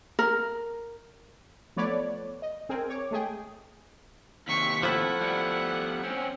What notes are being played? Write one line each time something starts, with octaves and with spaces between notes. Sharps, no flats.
A#4
F3 A3 B3 B4 C#5 D5
D#5
C4 G#4 A#4
C#5 D6
G#3 A3 G#4 G5
D#2 C3 C#6 B6
F3 A3 E4 F#5
G3 B3
C4 C#4